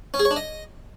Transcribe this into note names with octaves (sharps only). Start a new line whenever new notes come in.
C#4
G#4
C#5
D4
D#5